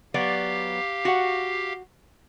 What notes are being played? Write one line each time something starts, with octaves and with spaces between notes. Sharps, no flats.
F#3 B3 G4 D5 F5
F#4 F#5